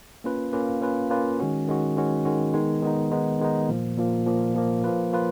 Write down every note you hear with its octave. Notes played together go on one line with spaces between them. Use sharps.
A#3 C#4 F4 B4
A#3 C#4 F4 B4
A#3 C#4 F4 B4
A#3 C#4 F4 B4
D#3 G#3 C#4 F#4
D#3 G#3 C#4 F#4
D#3 G#3 C#4 F#4
D#3 G#3 C#4 F#4
D#3 G#3 B3 D#4
D#3 G#3 B3 D#4
D#3 G#3 B3 D#4
D#3 G#3 B3 D#4
A#2 F3 A#3
A#2 F3 A#3
A#2 F3 A#3
A#2 F3 A#3
F3 A#3 F4 B4
F3 A#3 F4 B4